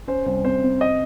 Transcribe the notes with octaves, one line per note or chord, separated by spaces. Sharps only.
C#4 C5
C2 C5
C3 C5
C3
D#5